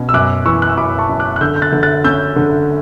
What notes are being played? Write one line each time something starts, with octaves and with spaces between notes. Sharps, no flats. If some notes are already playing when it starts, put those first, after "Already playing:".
Already playing: B2 C#4
E6
F#2 D6 F#6
E3 C#6 E6
F#6
E6
F#2 B5 D6
D6
A5 C#6
F#2
D6 F#6
F#6
D3 E6 G6
G6
F#6 A6
D3
F#6 A6
C#4 E6 G6
D3